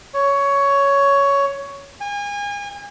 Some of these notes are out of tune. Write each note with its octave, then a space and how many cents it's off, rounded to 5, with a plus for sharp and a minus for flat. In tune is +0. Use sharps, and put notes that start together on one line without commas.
C#5 +10
G#5 -35